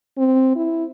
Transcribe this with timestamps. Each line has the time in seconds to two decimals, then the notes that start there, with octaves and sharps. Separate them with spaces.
0.18 C4
0.56 E4